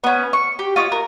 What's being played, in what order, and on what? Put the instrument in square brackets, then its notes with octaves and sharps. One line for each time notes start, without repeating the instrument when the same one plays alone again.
[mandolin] B3 C#4
C#6
G4
F4 C#5 D#5
A#4